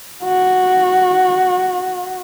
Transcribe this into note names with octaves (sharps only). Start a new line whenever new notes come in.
F#4